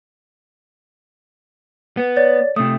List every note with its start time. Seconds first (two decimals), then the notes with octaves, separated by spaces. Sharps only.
1.97 B3
2.16 C#5 D5 A6
2.56 C3 A3 D#6